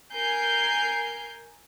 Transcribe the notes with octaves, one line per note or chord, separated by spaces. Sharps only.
A#4 G#5 G6 C7